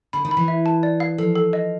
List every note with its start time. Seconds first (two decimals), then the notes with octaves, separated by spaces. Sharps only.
0.13 D3 B5
0.25 D#3
0.31 B5
0.37 E3
0.48 E5
0.66 A5
0.83 D5
1.00 F5
1.18 F3 A4
1.36 A4
1.53 D#5